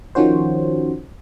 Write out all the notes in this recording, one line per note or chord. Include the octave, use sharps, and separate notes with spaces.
D#3 F3 C#4 F#4 C5